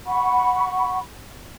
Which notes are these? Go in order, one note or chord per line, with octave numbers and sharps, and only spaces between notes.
F#5 B5 C#6